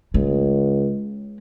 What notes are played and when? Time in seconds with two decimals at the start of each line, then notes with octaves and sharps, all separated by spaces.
0.14 C#2 G#3